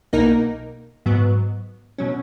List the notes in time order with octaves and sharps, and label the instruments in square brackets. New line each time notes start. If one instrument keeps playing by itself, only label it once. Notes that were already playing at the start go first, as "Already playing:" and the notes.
[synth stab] B1 B2 A#3 D#4 A#4
G#2 F#3 B3
B2 F#3 C#4